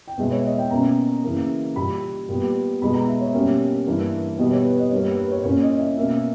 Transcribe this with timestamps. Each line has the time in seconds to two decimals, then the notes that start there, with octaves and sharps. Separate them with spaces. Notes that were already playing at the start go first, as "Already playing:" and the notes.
0.08 G5
0.18 B2 G#3 B3 E5
0.27 B4
0.32 C#5
0.45 D#5
0.52 E5
0.58 G5
0.70 B2 A#3 C#4 A#5
1.24 C#3 E3 A#3
1.76 A#2 G3 A#3 B5
2.29 A#2 G3 B3
2.82 B2 G#3 B3 B5
2.94 A#5
3.07 E5
3.21 C#5
3.33 B2 G3 A#3 C#4 C#5
3.86 G2 E3 A#3
4.38 B2 G3 B3 D#5
4.52 C#5
4.65 B4
4.79 D#5
4.91 G2 G3 A#3 C#5
5.05 B4
5.18 B4
5.32 C#5
5.44 A#2 A#3 C#4 C#5
5.62 D#5
5.75 D#5
5.79 E5
5.97 B2 A#3 C#4 E5